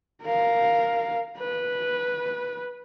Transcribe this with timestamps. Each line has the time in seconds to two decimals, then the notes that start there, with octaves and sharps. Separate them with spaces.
0.23 A#4 F5
1.38 B4